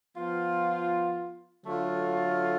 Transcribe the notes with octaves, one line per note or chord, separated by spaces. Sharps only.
F3 B3 F4
D3 F#3 A3 F4